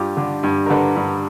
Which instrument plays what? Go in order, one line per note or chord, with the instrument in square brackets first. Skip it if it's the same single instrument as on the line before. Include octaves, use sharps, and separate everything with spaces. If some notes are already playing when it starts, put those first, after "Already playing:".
Already playing: [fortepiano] G2 F4 G4
D3
G2
A#4
D3 A4 B4
G2